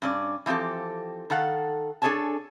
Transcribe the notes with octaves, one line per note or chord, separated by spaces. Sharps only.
G2 C#4 D5
E3 F3 C4 G4 A4
D#3 A4 F5 F#5
D4 G#4 A4 C#5 G#5 A5